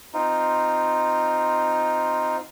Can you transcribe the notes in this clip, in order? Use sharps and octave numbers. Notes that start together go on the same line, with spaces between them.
C4 D#4 F4